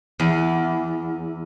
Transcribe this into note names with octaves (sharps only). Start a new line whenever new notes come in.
E2